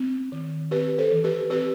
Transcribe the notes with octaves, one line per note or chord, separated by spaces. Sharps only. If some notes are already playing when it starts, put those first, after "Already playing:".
Already playing: C4
D#3
C4 G4 B4
A4 C5
E3
G4 B4
C4 G4 B4